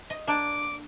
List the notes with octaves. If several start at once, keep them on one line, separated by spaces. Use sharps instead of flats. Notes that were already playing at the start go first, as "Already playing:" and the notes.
D#5
A#3 D4 D6